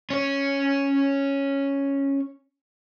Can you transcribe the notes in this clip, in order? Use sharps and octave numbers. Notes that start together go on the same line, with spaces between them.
C#4 C#5